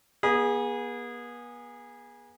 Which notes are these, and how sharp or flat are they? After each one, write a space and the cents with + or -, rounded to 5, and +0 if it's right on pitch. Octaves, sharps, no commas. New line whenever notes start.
B3 -40 G#4 -15